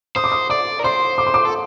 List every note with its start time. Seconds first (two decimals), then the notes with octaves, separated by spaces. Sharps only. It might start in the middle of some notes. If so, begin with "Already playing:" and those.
0.16 C5 D#6
0.24 D6
0.32 D#6
0.50 D5 D6
0.79 A#4
0.84 C5 C6
1.18 D6
1.27 C6
1.34 D6
1.45 A4